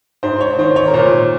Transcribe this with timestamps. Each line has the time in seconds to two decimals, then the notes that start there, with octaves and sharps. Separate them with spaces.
0.23 G#2 C5
0.41 C#5
0.58 D#3 C5
0.76 C#5
0.88 A#4
0.94 A#2 C5